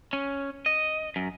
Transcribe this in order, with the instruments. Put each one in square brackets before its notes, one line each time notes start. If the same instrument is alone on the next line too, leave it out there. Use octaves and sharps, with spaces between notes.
[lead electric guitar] C#4
D#5
F#2